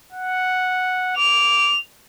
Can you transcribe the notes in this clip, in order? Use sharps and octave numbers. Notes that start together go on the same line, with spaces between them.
F#5
D6 F7